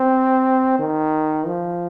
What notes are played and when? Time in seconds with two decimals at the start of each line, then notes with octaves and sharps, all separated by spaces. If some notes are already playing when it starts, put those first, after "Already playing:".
Already playing: C4
0.79 D#3
1.47 F3